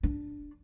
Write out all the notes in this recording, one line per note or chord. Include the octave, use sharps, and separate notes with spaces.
D4